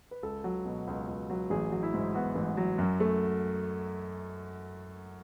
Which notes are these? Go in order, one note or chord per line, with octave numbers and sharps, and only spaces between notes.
B4
C#2 A4
F#3
B2
C#2
C#2
F#3
A1 G#4
F#3
E4
G#2
B3 F#4
A1
F#3
F#2
A3